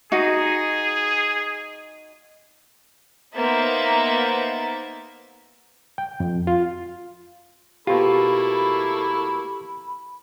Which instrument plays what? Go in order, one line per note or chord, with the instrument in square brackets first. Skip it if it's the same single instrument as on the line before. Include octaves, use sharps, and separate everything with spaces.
[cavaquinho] D#4 F#4 [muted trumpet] G#4
[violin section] A#3 B3 D#4 C5 E5 A6
[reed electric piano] G5
F2
F4
[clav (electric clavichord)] B2 F4 [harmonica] A3 A#3 E4 [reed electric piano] G4 [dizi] B5